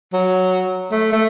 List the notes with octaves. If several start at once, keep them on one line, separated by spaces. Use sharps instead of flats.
F#3
A3
A3